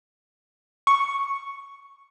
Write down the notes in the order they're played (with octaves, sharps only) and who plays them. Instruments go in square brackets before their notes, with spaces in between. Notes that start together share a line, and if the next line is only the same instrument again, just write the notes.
[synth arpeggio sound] C#6